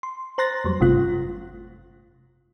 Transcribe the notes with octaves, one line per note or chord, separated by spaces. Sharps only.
C6
C5 A#5 C6 F#6 A6 A#6
F2 F#3 G3
G1 C3 A3 F4 F#6